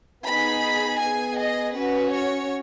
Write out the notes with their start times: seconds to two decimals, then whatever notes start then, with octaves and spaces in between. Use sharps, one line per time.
0.25 B3 D#4 G#4 B5
0.99 B3 G#4 G#5
1.37 D#5
1.75 C#4 F#4 B4
2.12 C#5